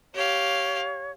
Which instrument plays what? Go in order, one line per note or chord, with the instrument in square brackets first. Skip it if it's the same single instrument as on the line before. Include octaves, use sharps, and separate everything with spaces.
[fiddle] G4 F5 [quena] C#5